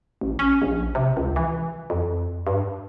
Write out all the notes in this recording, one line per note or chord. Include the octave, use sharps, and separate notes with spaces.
A1
C#4
A#1
C3
C#2
E3
F2
G2